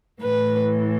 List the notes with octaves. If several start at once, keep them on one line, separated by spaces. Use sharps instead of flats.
A2 E3 B4